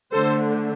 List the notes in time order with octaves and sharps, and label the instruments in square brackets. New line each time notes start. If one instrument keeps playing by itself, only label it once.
[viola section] D3 A3 D4 A4 C5